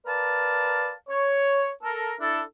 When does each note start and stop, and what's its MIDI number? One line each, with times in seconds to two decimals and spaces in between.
0.06 0.92 70
0.06 0.92 71
0.06 0.92 74
0.06 0.92 77
0.06 0.92 81
1.09 1.69 73
1.82 2.14 69
1.82 2.14 70
2.20 2.42 62
2.20 2.42 64
2.20 2.42 69